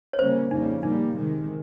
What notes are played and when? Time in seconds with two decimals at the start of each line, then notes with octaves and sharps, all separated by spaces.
0.13 C#5
0.18 C#3 G3 A#3 C#4 C5
0.50 F2 C#3 G3 A#3 D#4
0.82 C3 G3 A#3 D#4
1.15 C3 D#3 G#3